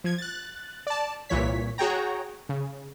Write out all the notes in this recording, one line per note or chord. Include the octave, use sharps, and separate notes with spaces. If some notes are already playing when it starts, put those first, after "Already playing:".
F3 G#6
F#6 A6
D5 A5
C2 A#2 E3 C#5 B6
F#4 G#4 C#5 G5 A#5
C#3